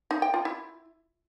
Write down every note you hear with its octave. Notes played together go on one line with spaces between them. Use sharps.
D#4
G5
F4
E4